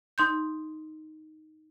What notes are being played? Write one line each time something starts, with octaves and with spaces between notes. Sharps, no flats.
D#4 C6 G6